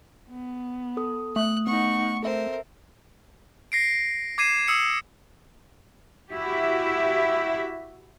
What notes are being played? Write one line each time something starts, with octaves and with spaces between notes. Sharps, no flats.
B3
A4 D#6
A3 D#6 F#6
B3 D#4 F#5 C#6
C4 A4 A#4 C5 E5
A#6 C7 D7
D6 G#6 C7 D#7 E7
D#6 E6 C#7
E4 F#4 G4 E5